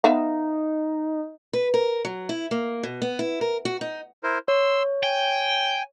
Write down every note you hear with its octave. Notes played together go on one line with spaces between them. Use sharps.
B3 D#4 E5 F5
B4
A#4
F#3
E4
A#3
B2
B3
E4
A#4
F#4
D#4
E4 A#4 C5
C#5 C6 E6
G5 G#5